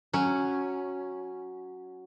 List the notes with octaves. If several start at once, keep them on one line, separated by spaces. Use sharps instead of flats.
F#3 C#4